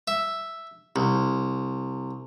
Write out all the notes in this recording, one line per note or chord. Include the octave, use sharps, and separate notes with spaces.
E5
C2